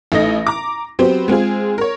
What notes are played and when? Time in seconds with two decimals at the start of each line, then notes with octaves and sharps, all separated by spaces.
0.12 A1 A3 D#4 D#5 A#6
0.47 A#5 D6
0.99 F#3 B3 C4 G4 C5
1.28 G#3 C4 F4 G#4
1.78 A#4 C#5